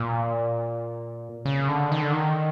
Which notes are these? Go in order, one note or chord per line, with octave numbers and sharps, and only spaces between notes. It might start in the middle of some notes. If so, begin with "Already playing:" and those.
Already playing: A#2
C#3
D3
D#3
D3
D#3